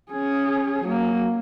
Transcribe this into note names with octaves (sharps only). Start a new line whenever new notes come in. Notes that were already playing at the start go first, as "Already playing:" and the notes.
C#4 G#4
F#3 A#3